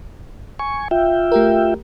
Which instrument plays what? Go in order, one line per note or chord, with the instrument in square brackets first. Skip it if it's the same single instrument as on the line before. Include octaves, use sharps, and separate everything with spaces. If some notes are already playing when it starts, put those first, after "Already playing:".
[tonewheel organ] G#5 C#6
F4 E5 G5
[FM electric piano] A3 G4 A#4